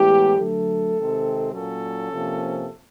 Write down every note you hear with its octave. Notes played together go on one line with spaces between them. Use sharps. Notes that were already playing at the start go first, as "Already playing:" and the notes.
Already playing: A2 E3 G#3 B3 G4
D3 F#3 A3 A4
C3 D#3 G#3 C4
A#2 F#3 A#3 C#4 A4
C3 F3 A#3 C#4